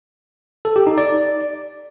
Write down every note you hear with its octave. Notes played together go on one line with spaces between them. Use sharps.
A4
G4
D#4
D5